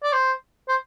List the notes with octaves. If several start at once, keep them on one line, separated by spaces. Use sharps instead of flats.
D5
C5
C5